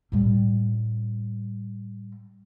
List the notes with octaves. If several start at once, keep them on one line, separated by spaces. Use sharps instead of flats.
A2 G3